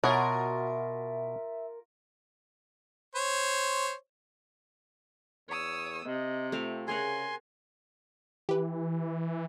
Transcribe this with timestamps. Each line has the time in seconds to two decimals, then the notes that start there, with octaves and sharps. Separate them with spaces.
0.04 B2 F4 F#4 A#4 C#5 E5
3.15 C5 C#5
5.49 E2 C#5 D#6 E6
6.05 C3 D#5
6.52 A3 C4 F4 F5
6.88 C#3 G#4 A#4 F#5 G#5 C6
8.49 E3 G4 B4